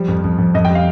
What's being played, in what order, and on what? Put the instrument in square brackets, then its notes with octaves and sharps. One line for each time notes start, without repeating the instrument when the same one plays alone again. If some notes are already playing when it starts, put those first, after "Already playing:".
Already playing: [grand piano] F3 G3
F2
F2
F2
F2 D#5
G5
G3
F5